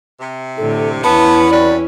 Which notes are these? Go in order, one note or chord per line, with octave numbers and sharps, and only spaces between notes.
C3
A2 D3 A4
E2 B3 C#4 E4 A5 B5
C3 F#4 B4 D5